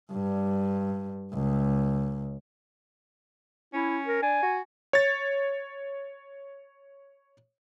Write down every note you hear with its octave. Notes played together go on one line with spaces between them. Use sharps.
G2
C#2
C#4 E4
A#4
D4 G#5
F#4
C#5 A6